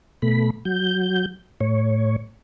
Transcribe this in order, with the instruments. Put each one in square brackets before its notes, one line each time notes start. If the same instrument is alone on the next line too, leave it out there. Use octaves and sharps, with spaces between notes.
[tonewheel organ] B2 A3 B5
F#3 G6
A2 C#5